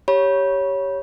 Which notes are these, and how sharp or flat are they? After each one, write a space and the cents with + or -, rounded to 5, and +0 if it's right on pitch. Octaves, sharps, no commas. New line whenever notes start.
G4 +0 C#5 +0 B5 -30